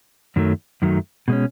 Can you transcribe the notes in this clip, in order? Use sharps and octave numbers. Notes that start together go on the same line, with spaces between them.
F#2 D#3 F#3 A3
F#2 D#3 F#3 A3
B2 G#3 C#4